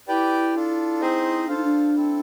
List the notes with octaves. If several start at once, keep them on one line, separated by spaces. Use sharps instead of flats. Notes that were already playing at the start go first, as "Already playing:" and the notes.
E4 G4 B4 D5 G5
D4 F4 A4
C4 D#4 G#4 C5 D#5
D4 F4 A4 C5 F5
D#4
D4
C4 E4 A4